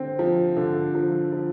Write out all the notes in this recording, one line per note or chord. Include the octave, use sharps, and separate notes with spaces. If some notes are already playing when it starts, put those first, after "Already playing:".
Already playing: D3 C4
F3
D3
F3
F3